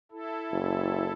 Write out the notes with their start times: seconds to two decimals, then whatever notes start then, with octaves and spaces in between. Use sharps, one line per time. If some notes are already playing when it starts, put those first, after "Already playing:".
0.11 E4 A4
0.51 F#1